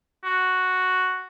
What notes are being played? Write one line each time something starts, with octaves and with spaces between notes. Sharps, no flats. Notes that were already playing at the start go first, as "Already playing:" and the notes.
F#4